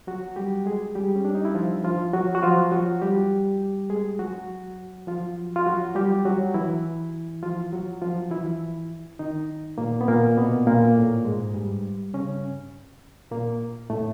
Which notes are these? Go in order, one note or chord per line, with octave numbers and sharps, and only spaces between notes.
F#3 F#4
G3 G4
G#3 G#4
G3 G4
C#4
D4
D#4
E4
F3 F4
F3 F4
F#3 F#4
F#4
F3 F4
F#3 F#4
G3 G4
G#3 G#4
F#3 F#4
F3 F4
F4
F#3 F#4
G3 G4
F#3 F#4
E3 E4
F3 F4
F#3 F#4
F3 F4
E3 E4
D#3 D#4
A#2 A#3
B3
A#2 A#3
B2 B3
A#2 A#3
A2 A3
G#2 G#3
G2 G3
C#3 C#4
A#2 A#3
A2 A3